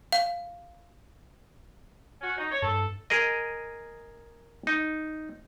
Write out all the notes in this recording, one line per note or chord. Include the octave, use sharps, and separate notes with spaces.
F5
C#4 F#4
D#4
C#5
G2 A4
G#4 A#4 D#5
D#4